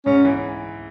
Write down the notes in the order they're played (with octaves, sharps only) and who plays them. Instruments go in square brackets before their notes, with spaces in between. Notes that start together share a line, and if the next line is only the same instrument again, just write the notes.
[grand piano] G#2 [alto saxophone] C#4
[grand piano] E3